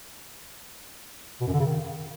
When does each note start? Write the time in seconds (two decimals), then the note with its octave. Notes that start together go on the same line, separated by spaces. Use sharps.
1.41 B2
1.47 F#2
1.53 D3
1.60 C#3
1.66 D#3